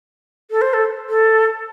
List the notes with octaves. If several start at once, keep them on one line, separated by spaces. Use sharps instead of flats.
A4
C5
A4
A4